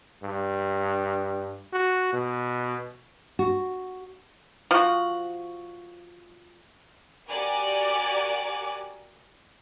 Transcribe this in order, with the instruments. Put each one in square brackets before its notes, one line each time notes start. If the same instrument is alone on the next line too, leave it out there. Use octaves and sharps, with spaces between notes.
[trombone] G2
F#4
B2
[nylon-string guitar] F#4
[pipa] F3 F#4
[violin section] F#4 G4 A#4 D5 F#5 G#5